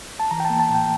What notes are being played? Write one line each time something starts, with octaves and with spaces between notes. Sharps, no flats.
A5
E3 A#5
G5
A5
A#3
A5
A2 G5